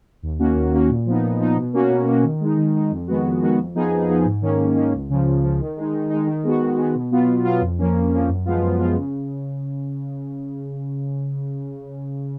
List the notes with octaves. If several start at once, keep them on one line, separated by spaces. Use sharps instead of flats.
D#2
D#3 A#3 C#4 F#4
D#2
D#3 A#3 C#4 F#4
A#2
F3 B3 D#4
A#2
F3 B3 D#4
B2
A#3 C#4 F#4
B2
A#3 C#4 F#4
D#3
G#3 D#4
D#3
G#3 D#4
F2
D#3 G#3 B3 F#4
F2
D#3 G#3 B3 F#4
F2
F3 B3 D#4 G#4
F2
F3 B3 D#4 G#4
G#2
D#3 A#3 C#4
G#2
D#3 A#3 C#4
C#2
C#3 F3
C#2
C#3 F3
D#3
G#3 D#4
D#3
G#3 D#4
D#3
G#3 B3 F#4
D#3
G#3 B3 F#4
B2
F#3 B3 F4
B2
F#3 B3 F4
F2
F3 A#3 C#4
F2
F3 A#3 C#4
F#2
F3 G#3 B3 F4
F#2
F3 G#3 B3 F4
C#3